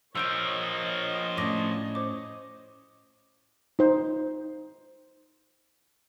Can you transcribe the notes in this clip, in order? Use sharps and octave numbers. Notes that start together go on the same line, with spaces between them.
F3 A#4 C#5 D#5 E6 G6 D7
A2 C#4 D5 D6 A#6
C5 D6
D#4 C5